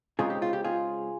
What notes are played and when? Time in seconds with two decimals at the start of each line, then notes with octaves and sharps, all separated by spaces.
0.19 C#3 G#3 C4 D#4 F4 G#4
0.30 G4
0.42 F4
0.53 G4
0.64 F4 G#4